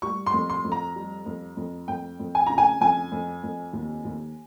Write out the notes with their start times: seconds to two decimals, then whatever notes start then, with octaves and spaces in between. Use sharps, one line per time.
0.02 G3 C#6
0.26 C6
0.34 F2
0.50 C6
0.65 F2
0.72 A#5
0.96 G3
1.26 F2
1.57 F2
1.88 F2 G5
2.20 F2
2.35 G#5
2.46 C#3 A#5
2.58 G#5
2.81 F2 G#5
3.12 F2
3.44 F2
3.73 D#2
4.05 D#2